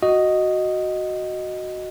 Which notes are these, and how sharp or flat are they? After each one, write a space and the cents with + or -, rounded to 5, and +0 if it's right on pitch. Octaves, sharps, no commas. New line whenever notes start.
F#4 +0 D#5 +0